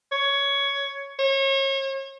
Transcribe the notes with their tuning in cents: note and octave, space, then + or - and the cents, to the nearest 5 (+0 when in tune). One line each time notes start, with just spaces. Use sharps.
C#5 +10
C#5 -35